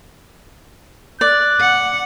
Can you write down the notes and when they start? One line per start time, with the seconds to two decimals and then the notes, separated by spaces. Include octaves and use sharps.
1.21 D5 F#6
1.60 F#5